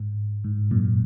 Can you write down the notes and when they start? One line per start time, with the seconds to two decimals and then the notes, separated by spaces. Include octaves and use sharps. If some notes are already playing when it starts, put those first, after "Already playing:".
Already playing: G#2
0.44 G#2
0.71 F#2 A#2